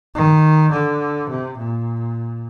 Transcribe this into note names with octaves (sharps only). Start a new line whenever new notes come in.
D#3
D3
C3
A#2